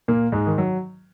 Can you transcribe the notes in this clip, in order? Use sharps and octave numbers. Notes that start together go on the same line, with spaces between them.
A#2 A#3
G#2 G#3
D#3
F#3